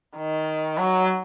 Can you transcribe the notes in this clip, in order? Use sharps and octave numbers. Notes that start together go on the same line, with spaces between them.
D#3
F#3